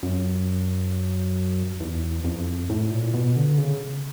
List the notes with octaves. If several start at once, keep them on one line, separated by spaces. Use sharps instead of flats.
F#2
E2
F2
A2
A#2
B2
D3
C#3